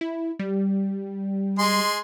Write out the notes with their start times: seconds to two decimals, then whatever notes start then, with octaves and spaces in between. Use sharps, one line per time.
0.01 E4
0.39 G3
1.59 G#3 G#4 C6